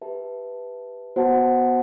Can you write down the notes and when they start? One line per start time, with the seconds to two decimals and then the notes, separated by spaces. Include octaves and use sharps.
0.02 G4 B4 E5 A5
1.16 B3 F#4 C5 F#5 A5